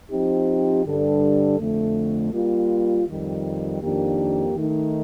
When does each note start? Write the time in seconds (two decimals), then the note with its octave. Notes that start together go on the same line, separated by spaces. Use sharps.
0.11 F3 C4 D#4 G4
0.85 G2 D3 G3 D4 A4
1.59 F2 D3 A3
2.33 G3 A#3 F4
3.07 F2 D#3 G3
3.82 F2 D#3 A#3 D4 G4
4.55 D#3 A3 D#4